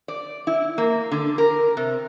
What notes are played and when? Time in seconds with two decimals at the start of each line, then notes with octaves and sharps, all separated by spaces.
0.08 D5
0.47 E4
0.78 A#3
1.12 D3
1.38 A#4
1.77 C3